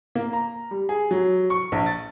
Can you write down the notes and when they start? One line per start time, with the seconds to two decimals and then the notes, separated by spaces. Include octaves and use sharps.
0.15 A#3
0.33 A#5
0.71 G3
0.89 G#4
1.11 F#3
1.50 C#6
1.72 A#1
1.86 A6